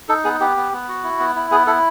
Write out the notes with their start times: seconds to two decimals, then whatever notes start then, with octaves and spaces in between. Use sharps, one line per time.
0.09 D#4 A4
0.24 B3 G#4
0.40 B3 G4
0.57 B3
0.72 B3
0.88 F#4
1.04 E4
1.20 B3
1.35 E4
1.51 B3 G#4
1.67 E4 A4